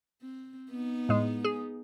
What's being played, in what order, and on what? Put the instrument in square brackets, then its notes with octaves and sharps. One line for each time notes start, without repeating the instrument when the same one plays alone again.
[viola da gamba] C4
B3 D#4
[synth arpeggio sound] A2 G#3
G#4